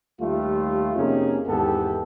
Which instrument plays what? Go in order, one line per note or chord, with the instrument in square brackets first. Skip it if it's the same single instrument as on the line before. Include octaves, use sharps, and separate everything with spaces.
[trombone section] D#2 G3 A3 F4
F2 C3 A#3 C#4 D#4 G#4
G#1 E2 G#2 B3 G4 A4